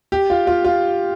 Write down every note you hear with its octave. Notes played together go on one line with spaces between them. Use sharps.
G4
F4
F4
F4